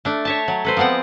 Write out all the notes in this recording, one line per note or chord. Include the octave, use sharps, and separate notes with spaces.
A3 D4
C#5 E5 A5
F#3
A4 B4 C5
F3 G#3 B3 C4 F#5